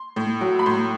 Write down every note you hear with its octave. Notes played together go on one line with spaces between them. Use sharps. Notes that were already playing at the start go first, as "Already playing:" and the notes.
Already playing: C6
A2
F#3
B5
A2 C6